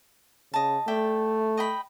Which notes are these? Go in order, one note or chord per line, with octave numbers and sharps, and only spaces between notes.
C#3 D#5 A5
A3 D5 E5 G5
D#5 G5 B5